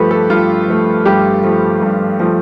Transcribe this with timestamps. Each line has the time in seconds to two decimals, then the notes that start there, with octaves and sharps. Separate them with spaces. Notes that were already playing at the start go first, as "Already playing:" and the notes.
Already playing: G2 F3 A3 G4 A4 B4
0.11 A4
0.30 G2 F4
0.68 F3 A3
1.06 G2 G4
1.43 F3 A3
1.82 G2
2.20 F3 A3